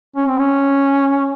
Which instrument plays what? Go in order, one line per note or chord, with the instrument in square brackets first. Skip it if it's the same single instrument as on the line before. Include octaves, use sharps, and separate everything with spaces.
[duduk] C#4
C4
C#4